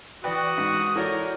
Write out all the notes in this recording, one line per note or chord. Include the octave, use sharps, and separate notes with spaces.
E3 F#4 B4 D5 G5 C#6 D#6
G#2
E3 F#4 A4 A#4 C#5 D5 G6